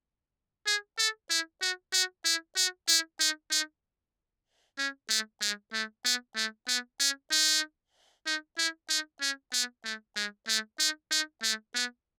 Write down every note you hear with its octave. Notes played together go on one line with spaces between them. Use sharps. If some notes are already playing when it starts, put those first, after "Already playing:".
G#4
A4
E4
F#4
F#4
E4
F#4
E4
D#4
D#4
C#4
A3
G#3
A3
B3
A3
B3
C#4
D#4
D#4
E4
D#4
C#4
B3
A3
G#3
A3
D#4
D#4
A3
B3